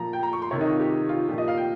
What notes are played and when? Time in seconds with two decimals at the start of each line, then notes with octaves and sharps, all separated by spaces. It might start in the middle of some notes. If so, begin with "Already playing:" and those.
Already playing: A#2 F3 A#5
0.13 G5
0.23 A#5
0.33 C#6
0.42 C6
0.51 C3 D#3 C#5
0.61 D#4
0.70 F4
0.80 G4
0.91 G4
1.09 F4
1.28 A#2 F3 G4
1.38 D#5
1.48 F5
1.57 G5